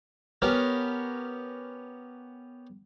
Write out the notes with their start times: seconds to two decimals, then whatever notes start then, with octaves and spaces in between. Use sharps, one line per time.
0.42 B3 C#4 G4 A#4